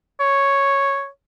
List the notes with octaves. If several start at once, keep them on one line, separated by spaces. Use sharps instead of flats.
C#5